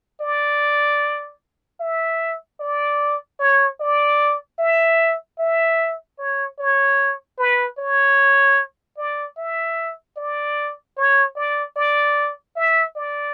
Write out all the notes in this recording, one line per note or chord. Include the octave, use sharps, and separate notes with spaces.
D5
E5
D5
C#5
D5
E5
E5
C#5
C#5
B4
C#5
D5
E5
D5
C#5
D5
D5
E5
D5